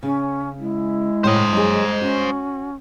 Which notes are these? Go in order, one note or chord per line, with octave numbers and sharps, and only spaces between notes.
C#3 C#4
G#3 E4
A2 C5 C#5 D#5
F#3 G#4
C#4 F#4